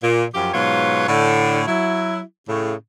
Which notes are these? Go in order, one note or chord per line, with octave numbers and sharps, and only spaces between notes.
A#2
F#2 F3 G4
G#2 B2 F#3 F4 B4 C#5
A2 D3
F#3 E4
A2 C#3